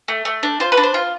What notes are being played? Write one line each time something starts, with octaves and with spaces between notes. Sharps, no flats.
A3
A3
D4
F4 C5
B4
D4
C5
F4